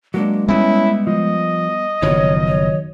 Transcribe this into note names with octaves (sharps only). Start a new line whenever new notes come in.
F#3 G#3 A#3 D4
G3 B3 C#4 E4
F3 D#5
F#1 B2 D#3 F3 F#3 C#5
C#5